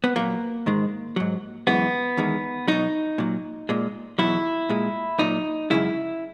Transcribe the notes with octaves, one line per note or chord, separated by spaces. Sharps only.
B3
A#2 F#3 A#3
G#2 D#3 G#3
G#2 F#3
F#2 E3 G#3 B3
E2 D#3 G#3
B2 F#3 D#4
A#2 F#3
A#2 G#3
E2 B2 F#3 E4
A#2 G#3
A#2 F#3 D#4
F#2 C#3 G#3 E4